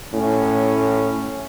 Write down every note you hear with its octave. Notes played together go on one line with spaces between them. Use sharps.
A2 C#4